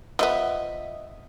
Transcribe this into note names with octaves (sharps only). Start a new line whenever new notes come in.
F3 B3 D#5 E5